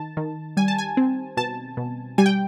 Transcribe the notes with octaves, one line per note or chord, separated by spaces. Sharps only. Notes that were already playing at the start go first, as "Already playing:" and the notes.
Already playing: D#3 A5
D#3
G3 G#5
A5
G#5
C4
B2 A5
B2
G3 G#5
G5